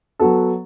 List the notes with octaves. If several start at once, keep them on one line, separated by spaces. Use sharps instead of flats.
F#3 B3 F#4 A4